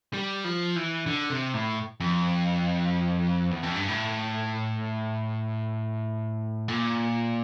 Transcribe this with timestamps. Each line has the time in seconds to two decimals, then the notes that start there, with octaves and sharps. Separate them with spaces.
0.14 G3
0.44 F3
0.76 E3
1.06 D3
1.30 C3
1.54 A2
2.00 F2
3.51 E2
3.63 F2
3.75 G2
3.88 A2
6.68 A#2